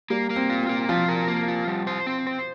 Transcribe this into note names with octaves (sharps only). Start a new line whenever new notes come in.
G3 A#3
A#3
C4
F4
C4
A#3
F3 F4
A#4
A#3
F4
G3
C5
C4
C5